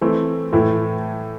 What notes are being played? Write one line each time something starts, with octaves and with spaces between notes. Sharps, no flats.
E3 A3 C4
A2 E3 A3 E4